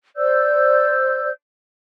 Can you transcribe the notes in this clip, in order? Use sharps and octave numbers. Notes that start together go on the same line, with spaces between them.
C5 D5 E6 G6